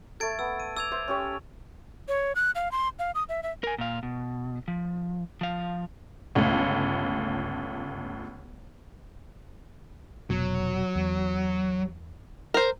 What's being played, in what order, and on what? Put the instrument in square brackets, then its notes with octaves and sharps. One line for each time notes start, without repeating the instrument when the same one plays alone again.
[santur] A3 A4 [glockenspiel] G#6 A6 D7
[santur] B3 [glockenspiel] E6
[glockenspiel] D#7
[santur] D6 [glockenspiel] E6 G#6 F7
[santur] C5 E5
C#4 G4 C#5
[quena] C#5
F#6
F5
C6
F5
D#6
E5
E5
[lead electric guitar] A#4 G#5
A#2 F5
B2
F3
F3 F5
[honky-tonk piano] G1 C#2 A3
[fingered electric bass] F1 B2 [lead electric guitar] F#3
[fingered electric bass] E2
[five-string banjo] A#4 C5